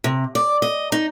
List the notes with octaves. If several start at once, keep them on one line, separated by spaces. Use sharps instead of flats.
C3
D5
D#5
D#4